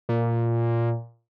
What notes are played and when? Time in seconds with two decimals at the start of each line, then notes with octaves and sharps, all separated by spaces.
0.09 A#2